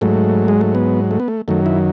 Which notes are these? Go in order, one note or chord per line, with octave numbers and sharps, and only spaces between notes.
G#2 F#3 A3
G#3
A3
B3
A3
B3
A3
F#2 D#3 F#3 A3
E4